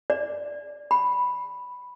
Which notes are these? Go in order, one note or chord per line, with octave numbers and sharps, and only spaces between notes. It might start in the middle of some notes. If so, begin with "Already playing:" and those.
D5
B5